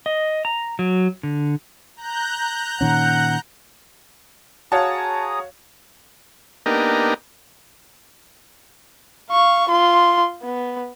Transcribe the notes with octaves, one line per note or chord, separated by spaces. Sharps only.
D#5
A#5
F#3
D3
A#5 F#6 G6
A#2 D#3 C#4 F#5
F#4 G#4 C#5 F5 A5 A#5 D#6
A#3 B3 D4 D#4 G4 A#4
F5 C#6
F4 C6
B3